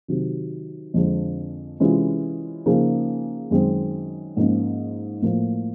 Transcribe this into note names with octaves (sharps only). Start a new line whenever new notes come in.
C3 D#3 F#3
F2 D3 F3 G#3
C3 E3 G#3 C#4 F4
C#3 F3 A#3 D#4 G#4
F#2 D#3 G#3 C4
G#2 F3 A#3 C#4
A2 F3 A#3